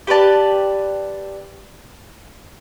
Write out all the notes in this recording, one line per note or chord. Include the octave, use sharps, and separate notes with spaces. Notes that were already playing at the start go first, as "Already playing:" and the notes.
G4 B4 D5 A5